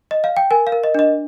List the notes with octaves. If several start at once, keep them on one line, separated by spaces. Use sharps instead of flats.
D#5
F5
G5
A#4 G#5
F5
A#4
D#5
D4 D#5